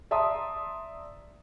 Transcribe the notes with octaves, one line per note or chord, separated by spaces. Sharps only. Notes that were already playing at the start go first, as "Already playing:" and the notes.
D5 E5 A5 A#5 C6 D#6